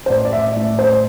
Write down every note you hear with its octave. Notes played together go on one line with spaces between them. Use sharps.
C5
A2 D5
D5
E5
A2 D5
C5